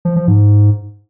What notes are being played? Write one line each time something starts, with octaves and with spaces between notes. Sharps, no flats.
F3
F3
G#2